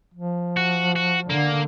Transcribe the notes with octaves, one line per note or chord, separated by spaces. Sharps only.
F3
F#4
F#4
D3 A#3